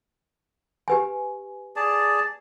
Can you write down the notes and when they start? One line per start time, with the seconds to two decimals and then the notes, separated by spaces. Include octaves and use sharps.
0.88 G4 B4 G#5
1.76 G#4 D5 A5